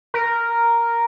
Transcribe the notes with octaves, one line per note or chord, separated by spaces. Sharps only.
A#4